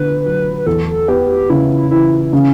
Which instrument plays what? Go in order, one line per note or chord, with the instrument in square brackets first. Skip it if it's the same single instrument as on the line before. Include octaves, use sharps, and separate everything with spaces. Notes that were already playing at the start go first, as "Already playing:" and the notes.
Already playing: [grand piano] D3 B3 [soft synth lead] B4
[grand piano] F#3
[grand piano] E2 [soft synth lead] A4
[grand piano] B3 [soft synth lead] G4
[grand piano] C#3 [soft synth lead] E4
[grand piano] E3 [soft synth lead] E4
[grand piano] C#3 [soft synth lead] C#4